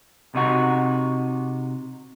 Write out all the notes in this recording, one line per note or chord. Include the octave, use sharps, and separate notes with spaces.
C3 D#4 F#4